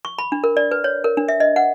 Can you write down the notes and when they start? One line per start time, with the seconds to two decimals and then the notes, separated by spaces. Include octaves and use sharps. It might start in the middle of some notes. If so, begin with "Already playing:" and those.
0.05 C#6
0.18 B5
0.32 D4
0.44 A#4
0.57 D5
0.71 B4
0.84 C#5
1.04 A#4
1.17 D4
1.28 E5
1.40 D#5
1.56 F#5